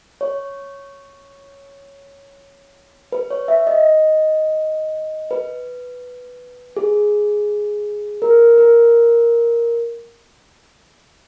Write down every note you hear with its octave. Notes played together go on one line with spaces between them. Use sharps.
C#5
B4
C#5
E5
D#5
B4
G#4
A#4
A#4